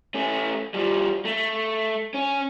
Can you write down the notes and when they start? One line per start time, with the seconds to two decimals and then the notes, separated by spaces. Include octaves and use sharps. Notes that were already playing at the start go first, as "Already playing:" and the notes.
0.14 A3 C#4
0.74 F3 G3
1.25 A3
2.14 C#4